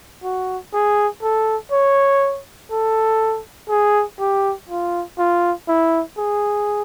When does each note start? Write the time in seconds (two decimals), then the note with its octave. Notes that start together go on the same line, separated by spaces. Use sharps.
0.23 F#4
0.73 G#4
1.22 A4
1.72 C#5
2.71 A4
3.69 G#4
4.19 G4
4.69 F4
5.18 F4
5.68 E4
6.18 G#4